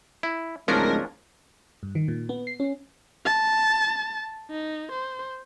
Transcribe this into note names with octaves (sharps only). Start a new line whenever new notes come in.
E4
D1 F3 G#3 C#4 D4 A#4
G2
D#3
A#2
B3
C7
C#4
A5
D#4
C5